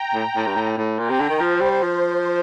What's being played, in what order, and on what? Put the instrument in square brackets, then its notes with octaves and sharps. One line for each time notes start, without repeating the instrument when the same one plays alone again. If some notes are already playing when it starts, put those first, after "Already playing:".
Already playing: [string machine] G5 A#5
[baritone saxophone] A2
A2
G2
A2
A2
[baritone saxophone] A#2 [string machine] G5 A#5
[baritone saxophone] C3
D3
D#3
[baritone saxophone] F3 [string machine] C5
[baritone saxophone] G3
F3